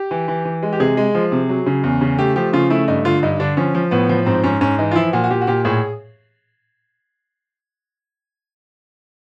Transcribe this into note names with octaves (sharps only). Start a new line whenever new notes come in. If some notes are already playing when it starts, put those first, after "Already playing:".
Already playing: G4
E3
E3
E3
G#3
G4
C3 G#4
G#3
F3
C3
F#3
C#3
E2
C#3
A3 G4
F3 G4
C#3 F4
A3 E4
G2 D#4
D3 F4
G2 D#4
D3 D4
F3 C#4
F3
A2 B3
F3
G#2 C4
G#2 C#4
G#2 C#4
E3 D#4
F4
F3 E4
A#2 F#4
F#4
A#2 G4
F#4
A#2 G4
A2 G#4